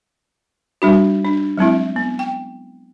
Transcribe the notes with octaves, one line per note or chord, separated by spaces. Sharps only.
G3 D4 F#4
D4
F#3 G#3 C4 E4
B3
G5